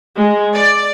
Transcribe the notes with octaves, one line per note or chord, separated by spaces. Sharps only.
G#3
D5